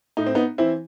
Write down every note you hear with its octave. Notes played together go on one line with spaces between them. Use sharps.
A2 D#4
C4
B3 D#4
E3 C4 E4